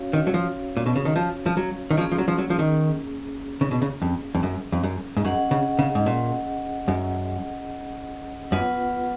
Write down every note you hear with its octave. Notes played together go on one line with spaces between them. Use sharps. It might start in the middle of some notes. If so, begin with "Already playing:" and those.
Already playing: C#4 F#4 C#5 F5
D#3
F#3
F3
A#2
B2
C#3
D#3
F3
F3
F#3
D#3
F3 A#3 C#4 G#4
F3
F#3
F3
F#3
F3
D#3
C#3
B2
C#3
F2
F2
F#2
F2
F#2
G#2
F#2 C#4 G#4 D#5 F#5
C#3
C#3
G#2
A#2
F#2
F#2 B3 F4 B4 F#5